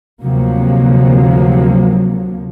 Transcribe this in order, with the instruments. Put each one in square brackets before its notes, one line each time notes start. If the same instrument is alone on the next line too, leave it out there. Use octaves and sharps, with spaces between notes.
[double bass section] D2 C3 F3 F#3 A#3